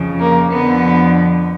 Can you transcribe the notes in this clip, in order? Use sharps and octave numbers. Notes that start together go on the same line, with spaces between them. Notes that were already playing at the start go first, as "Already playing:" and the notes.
Already playing: F2 C#3 F3
A#3
F2 D3 F3 B3